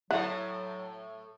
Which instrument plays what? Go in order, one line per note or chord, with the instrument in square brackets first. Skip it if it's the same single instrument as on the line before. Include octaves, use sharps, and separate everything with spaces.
[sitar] A2 A4 [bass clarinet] F#3 [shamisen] E4 F#5